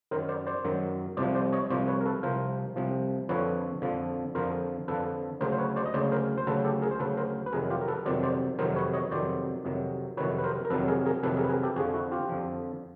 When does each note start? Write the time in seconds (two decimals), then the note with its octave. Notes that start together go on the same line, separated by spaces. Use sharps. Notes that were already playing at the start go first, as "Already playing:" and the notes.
0.11 F#2 D#3 F#3 A#4 C5
0.29 C5 D5
0.47 C5 D5
0.65 F#2 D#3 F#3
1.17 C2 C3 F3 C5 D5
1.35 C5 D5
1.52 C#5 D#5
1.70 C2 C3 F3 C5 D5
1.88 B4 C#5
2.01 A#4
2.06 A4 B4
2.23 C2 C3 F3 A#4 C5
2.76 C2 C3 F3
3.29 F2 D3 F3 B4 C#5
3.82 F2 D3 F3
4.35 F2 D3 F3 A#4 C5
4.88 F2 D3 F3 A4 B4
5.41 D2 C#3 F#3 A#4 C5
5.52 C5
5.58 B4 C#5
5.76 C5 D5
5.86 D#5
5.94 D2 C#3 F#3 C5 D5
6.12 A#4 C5
6.38 C5
6.47 D2 C#3 F#3 A4 B4
6.64 G4 A4
6.82 G#4 A#4
6.91 C5
7.00 D2 C#3 F#3 A4 B4
7.17 A#4 C5
7.46 B4
7.52 F2 C3 D#3 F#3 G#4 A#4
7.70 F4 G4
7.81 A#4
7.88 A4 B4
8.06 F2 C3 D#3 F#3 C5 D5
8.23 C5 D5
8.59 F2 C3 D#3 F#3 A#4 C5
8.76 B4 C#5
8.94 C#5 D#5
9.11 F2 C3 D#3 F#3 C5 D5
9.65 F2 C3 D#3 F#3
10.17 F2 C3 D#3 F#3 B4 C#5
10.38 B4
10.44 A#4 C5
10.65 A#4
10.70 F2 C3 D#3 F#3 A4 B4
10.88 G#4 A#4
11.06 G#4 A#4
11.23 F2 C3 D#3 F#3 A4 B4
11.36 G#4 A#4
11.43 B4
11.50 G#4 A#4
11.63 G4 A4
11.76 F2 D3 F3 F#4 G#4
11.94 E4 F#4
12.11 F4 G4
12.29 F2 D3 F3